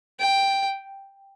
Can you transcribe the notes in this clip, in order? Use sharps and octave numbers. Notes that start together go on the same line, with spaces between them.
G5